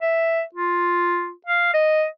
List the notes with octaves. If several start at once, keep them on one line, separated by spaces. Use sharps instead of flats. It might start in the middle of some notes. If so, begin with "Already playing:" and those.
E5
F4
F5
D#5